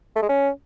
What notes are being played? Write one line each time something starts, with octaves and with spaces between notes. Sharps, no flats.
A3
G#3
C#4